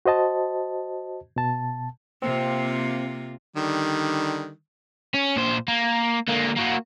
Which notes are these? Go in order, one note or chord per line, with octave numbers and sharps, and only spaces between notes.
F#4 C5 D#5 A5
B2 A5
C3 A#3 C4 F4
D3 D#3 G3
C#4
A#2 C5
A#3
D3 A#3
A#3 F#4